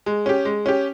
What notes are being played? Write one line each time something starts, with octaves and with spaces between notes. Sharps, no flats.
G#3
C#4 G4
G#3
C#4 G4